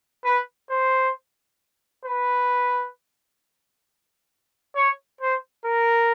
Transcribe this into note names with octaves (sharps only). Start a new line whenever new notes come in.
B4
C5
B4
C#5
C5
A#4